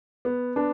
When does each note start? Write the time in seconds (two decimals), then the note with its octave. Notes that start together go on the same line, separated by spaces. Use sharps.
0.25 B3
0.56 B3 D4